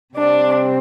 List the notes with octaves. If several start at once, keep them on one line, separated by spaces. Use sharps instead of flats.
C3 G3 C4 D4